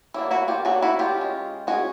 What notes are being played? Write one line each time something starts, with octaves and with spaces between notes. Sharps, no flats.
F#3 A#3 D4 E4
E4 F#4
F4 G4
F#3 A#3 D4 F#4 G#4
E4 F#4
F4 G4
C#4
G#3
G#3 C#4 F#4 G#4